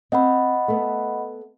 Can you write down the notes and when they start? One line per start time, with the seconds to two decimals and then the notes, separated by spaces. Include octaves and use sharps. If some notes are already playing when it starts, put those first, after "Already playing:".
0.12 C4 D#5 F#5 B5
0.68 A3 B3